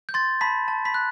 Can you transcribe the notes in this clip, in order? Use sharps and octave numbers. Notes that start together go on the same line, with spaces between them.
G6
C6 A6
A5 B5 B6
A5
B5 B6
F#6